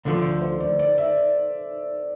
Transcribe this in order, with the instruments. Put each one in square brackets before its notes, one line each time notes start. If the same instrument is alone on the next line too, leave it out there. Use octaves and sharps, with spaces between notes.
[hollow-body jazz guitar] D2 D3 F3 A3 [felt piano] A4
[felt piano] C5
D5
D5
E5